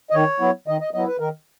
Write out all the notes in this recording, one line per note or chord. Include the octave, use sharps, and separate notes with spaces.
D#5
D#3 C#5
F#3 B3 E4
D#3 D#5
D#5
F#3 B3 E4 D#5
B4
D#3 A#4